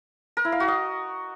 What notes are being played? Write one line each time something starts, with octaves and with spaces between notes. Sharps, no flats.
A#4
E4
F5
F#4
D#5